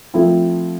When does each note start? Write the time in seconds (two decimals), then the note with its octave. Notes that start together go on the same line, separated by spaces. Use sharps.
0.14 F3 A3 C4 E4